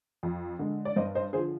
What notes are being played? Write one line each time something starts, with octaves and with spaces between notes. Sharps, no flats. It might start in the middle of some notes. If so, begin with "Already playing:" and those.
F2
D3 G#3
D5
G2 C5 D#5
C5 D#5
D3 F3 G#4 C5